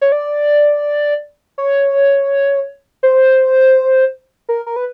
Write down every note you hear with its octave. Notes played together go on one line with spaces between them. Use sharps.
C#5
D5
C#5
C5
A#4
A#4
B4